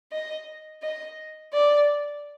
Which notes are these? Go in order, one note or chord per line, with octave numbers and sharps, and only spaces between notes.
D#5
D#5
D5